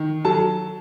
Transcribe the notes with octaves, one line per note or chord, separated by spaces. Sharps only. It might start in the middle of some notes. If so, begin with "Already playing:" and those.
Already playing: D#3
F#3 A4 A5